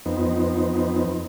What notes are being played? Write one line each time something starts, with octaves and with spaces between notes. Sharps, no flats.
F2 B3 C4 D#4